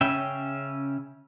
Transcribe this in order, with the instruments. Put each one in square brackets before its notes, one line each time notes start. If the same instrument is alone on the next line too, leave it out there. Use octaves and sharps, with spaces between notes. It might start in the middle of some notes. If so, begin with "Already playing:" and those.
[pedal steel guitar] C#3 C#4 E5 G5